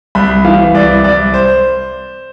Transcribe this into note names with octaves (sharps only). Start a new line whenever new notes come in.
C2 B5
E3 F5
C2 D5
C2 D5
C5